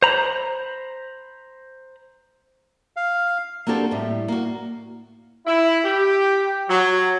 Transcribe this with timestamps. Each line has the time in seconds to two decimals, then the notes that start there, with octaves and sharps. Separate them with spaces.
0.03 C5 A#5 B5
2.96 F5
3.67 A#3 C4 D4 F#4 G4 A4
3.91 A2 G3
4.28 A#3 F#4
5.46 E4
5.84 G4
6.69 F#3